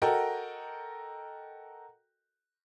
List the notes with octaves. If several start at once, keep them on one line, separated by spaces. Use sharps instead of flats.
F#4 A4 A#4 D#5 G5